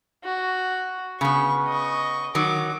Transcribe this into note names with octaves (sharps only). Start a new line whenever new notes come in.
F#4
C#3 B3 C#6
D#5 C#6
D#3 F#3 D6